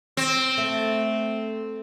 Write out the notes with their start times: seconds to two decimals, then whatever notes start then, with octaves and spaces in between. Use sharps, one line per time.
0.17 C4
0.58 A3